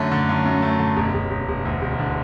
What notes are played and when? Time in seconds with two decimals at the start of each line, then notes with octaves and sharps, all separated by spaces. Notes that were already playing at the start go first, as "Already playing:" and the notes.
Already playing: F#2 D3 A3 C#5
0.12 D3
0.29 F#2
0.45 F#2
0.62 A3
0.79 D3
0.97 E1
1.14 E1
1.31 E1
1.48 E1
1.65 D2
1.82 E1
1.99 D3